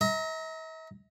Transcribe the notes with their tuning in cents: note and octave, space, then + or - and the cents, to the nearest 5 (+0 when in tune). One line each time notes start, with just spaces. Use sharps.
E5 -45 A#5 +0